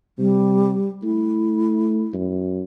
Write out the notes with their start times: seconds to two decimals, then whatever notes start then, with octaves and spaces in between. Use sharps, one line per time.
0.19 C3 G3
1.03 A3 E4
2.14 F#2